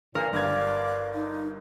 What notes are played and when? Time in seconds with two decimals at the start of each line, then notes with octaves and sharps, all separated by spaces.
0.15 G2 A#2 A#4 F5
0.33 G1 G2 D5 F5 G#6
1.14 D#4